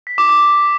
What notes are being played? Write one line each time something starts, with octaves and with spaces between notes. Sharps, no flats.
B6
D6
D6